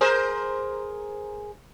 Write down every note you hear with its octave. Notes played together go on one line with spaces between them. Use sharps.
G#4 A#4 C5